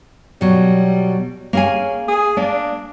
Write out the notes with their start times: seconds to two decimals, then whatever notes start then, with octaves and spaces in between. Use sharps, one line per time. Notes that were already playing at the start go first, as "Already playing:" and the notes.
0.41 B2 F#3 G3
1.53 A#3 C#4 G#4 G#5
2.08 G#4
2.37 A#3 D4